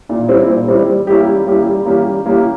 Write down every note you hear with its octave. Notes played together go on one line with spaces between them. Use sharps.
A#2
G3 C4 E4
A#2
G3 C4 E4
G3
A#3 C#4 E4 G4
G3
A#3 C#4 E4 G4
G3
A#3 C#4 E4 G4
G3
A#3 C#4 E4 G4